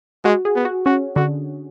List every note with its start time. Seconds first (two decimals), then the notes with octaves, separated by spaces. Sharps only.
0.24 G#3 F#4
0.45 G#4
0.55 B3
0.65 F#4
0.86 C#4 F#4
1.16 D3 F#4